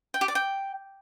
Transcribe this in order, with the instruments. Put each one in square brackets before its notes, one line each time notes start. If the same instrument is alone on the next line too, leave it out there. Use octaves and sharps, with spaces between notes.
[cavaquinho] G5
G4
D5
G5